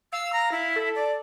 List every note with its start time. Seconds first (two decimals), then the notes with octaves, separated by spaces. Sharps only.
0.12 F5 E6
0.33 A#5
0.52 E4
0.76 A4
0.95 D5